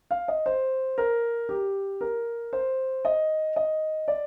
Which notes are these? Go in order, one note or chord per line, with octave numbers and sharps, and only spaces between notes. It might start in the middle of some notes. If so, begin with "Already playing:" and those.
F5
D#5
C5
A#4
G4
A#4
C5
D#5
D#5
D5